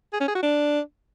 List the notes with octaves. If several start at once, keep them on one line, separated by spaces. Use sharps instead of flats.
G#4
C#4
G#4
F#4
D4